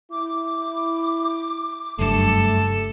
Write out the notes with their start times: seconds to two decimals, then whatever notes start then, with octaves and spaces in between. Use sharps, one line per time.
0.11 E4 D6
1.99 F#1 G2 A3 A4